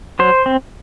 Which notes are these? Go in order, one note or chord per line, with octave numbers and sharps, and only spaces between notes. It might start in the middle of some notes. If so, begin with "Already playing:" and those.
F#3 C5
C4